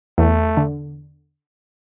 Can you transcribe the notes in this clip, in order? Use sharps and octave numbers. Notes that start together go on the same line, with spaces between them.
E2 A3
D3